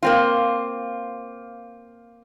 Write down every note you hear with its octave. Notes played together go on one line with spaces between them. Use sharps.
A#3 C4 F4